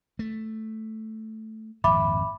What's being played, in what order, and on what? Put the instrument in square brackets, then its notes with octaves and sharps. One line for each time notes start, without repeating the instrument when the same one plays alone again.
[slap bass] A3
[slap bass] G#1 F2 A#2 [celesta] E5 B5 D6